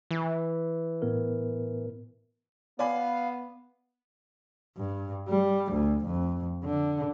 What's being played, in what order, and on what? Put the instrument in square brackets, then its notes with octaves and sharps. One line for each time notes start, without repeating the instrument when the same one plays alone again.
[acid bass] E3
[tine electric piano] A2 B3 A#4
[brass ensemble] B3 [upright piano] D5 G#5 B5 [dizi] F5
[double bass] G2
G3
D2
F2
D3